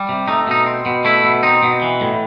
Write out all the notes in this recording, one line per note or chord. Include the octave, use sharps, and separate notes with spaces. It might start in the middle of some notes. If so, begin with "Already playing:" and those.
Already playing: G3
C3
A3 D#4
B2 D#4
C4
B2
A3 E4
B2
C4 D#4
B2
E3
A2